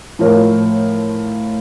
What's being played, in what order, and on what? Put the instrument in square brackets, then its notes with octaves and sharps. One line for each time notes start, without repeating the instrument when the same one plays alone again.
[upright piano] A2 F3 A#4 C#5